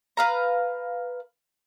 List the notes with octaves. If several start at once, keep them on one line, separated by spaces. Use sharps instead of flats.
B4 F5 A#5